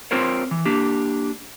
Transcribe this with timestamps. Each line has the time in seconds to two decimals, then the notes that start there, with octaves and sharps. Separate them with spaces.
0.11 C4 F4 A#4 C5 C#5
0.51 E3
0.65 A#3 D4 G4